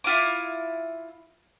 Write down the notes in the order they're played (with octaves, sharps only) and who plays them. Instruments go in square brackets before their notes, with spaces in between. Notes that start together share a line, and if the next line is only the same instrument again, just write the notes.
[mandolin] E4 F4 F5 D6